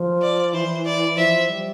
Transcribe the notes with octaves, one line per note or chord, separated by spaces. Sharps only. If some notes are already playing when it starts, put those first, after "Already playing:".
Already playing: F3
D5
E3 C5
D5
F3 E5
G3